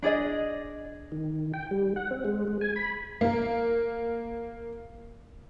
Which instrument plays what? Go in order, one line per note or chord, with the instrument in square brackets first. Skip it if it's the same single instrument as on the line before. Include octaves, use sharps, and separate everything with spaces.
[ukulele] D4 G#4 D5 D#5
[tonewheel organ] D#3
G5
G3
F#5
C4
G#3
G#3
G#5
B5
[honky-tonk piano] A#3 A#4